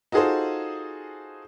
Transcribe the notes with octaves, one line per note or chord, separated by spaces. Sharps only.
D#4 F4 F#4 G#4 A4 C5